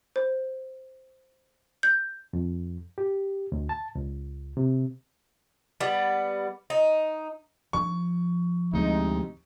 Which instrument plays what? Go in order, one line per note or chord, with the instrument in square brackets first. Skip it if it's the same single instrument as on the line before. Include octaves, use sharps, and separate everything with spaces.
[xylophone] C5
G6
[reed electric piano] F2
G4
D2
A5
C#2
C3
[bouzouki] G3 B3
D#4
[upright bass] F3 [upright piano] C#6
[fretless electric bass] D2 G3 G#3 [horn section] C3 D#4